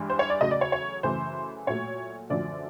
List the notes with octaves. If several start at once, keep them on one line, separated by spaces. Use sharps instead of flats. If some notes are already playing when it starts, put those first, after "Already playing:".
Already playing: G2 E3 G#3
C5
C#5
D5
E2 C#3 F#3 A3 D#5
D5
C#5
C#5
F#2 C#3 E3 A3 C5
A#2 F#3 A3 C#5
F#2 D3 F3 A3 D5